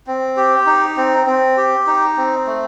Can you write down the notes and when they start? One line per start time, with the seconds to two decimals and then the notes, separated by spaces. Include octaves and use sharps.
0.07 C4
0.36 G4
0.66 D#4
0.97 C4
1.26 C4
1.57 G4
1.87 D#4
2.17 C4
2.46 A3